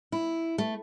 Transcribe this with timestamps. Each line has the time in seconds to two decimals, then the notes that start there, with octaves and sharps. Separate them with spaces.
0.12 E4
0.58 A3